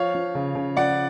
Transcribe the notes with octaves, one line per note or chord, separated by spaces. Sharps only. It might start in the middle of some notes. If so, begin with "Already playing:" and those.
Already playing: F3 C#5 F5
F3
C#3
C#3
F3 D5 F#5